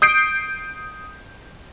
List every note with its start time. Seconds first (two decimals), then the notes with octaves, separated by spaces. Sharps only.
0.02 D#6 G6 C7 D7